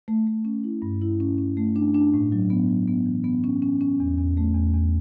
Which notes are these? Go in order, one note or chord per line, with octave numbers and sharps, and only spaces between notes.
A3
A3
C#4
E4
G2
E4
C#4
C#4
A3
D4
D4
A2
F#3
B3
F#3
B3
E3
B3
C#4
C#4
C#4
E2
E2
A3
E2
E2